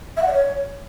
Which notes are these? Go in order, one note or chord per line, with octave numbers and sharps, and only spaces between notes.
E5
F#5
D5
C#5